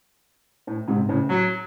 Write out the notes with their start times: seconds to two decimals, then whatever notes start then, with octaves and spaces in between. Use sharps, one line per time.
0.67 A2
0.88 G#2 C3
1.09 A2 C#3
1.30 F#3